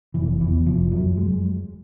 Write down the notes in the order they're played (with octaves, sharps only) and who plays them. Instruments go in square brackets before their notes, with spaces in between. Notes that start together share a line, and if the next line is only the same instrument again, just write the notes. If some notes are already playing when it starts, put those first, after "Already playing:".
[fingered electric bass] F1 E3
E2 E3
F1 F3
F#2 F#3
G#3